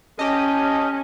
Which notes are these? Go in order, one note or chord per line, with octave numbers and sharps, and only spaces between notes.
C#4 G4 D#5 A5